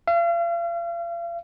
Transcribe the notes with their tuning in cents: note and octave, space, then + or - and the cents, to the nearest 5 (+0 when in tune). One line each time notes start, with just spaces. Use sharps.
F5 -40